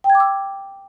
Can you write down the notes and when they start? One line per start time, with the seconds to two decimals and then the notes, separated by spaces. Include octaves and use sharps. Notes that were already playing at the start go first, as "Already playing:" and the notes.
0.04 G5
0.10 G#6
0.15 D6
0.20 E6